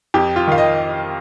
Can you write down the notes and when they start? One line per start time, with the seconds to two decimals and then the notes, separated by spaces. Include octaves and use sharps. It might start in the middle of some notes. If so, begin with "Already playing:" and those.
0.14 F2 G4
0.36 F4
0.47 D#3 F5
0.58 D#5